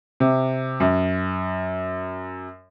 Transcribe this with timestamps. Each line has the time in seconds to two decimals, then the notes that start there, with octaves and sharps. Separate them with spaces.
0.20 C3
0.80 F#2